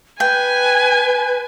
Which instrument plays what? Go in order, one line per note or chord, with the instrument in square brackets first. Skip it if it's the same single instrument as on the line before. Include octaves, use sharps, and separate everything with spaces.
[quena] B4 [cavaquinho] G5 [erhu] G#5